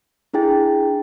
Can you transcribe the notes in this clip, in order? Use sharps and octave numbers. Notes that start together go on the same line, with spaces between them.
D4 E4 G#4 G5 A6